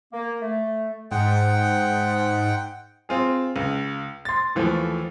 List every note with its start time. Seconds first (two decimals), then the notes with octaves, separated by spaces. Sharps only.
0.12 A#3
0.42 A3
1.11 G#2 F#5 G5
3.09 C4 F4 G#4
3.56 C#2
4.25 C6 A6
4.55 D#2 E3 F3 A3